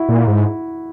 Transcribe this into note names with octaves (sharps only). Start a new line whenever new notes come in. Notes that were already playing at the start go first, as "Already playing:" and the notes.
Already playing: E4 F#4
A#2
G#2